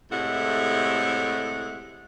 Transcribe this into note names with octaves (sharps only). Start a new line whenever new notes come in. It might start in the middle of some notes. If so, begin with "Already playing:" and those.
A2 C3 G#3 A3 E4 F#5